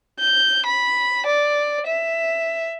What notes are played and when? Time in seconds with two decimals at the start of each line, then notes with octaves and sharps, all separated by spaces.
0.20 G6
0.66 B5
1.26 D5
1.87 E5